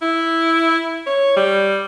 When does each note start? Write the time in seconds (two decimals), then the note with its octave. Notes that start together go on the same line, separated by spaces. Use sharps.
0.02 E4
1.06 C#5
1.36 G3